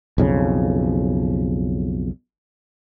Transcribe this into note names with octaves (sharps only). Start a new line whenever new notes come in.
B1 F2 C#3